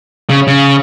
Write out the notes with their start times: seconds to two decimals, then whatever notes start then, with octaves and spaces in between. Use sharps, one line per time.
0.30 C#3
0.47 C#3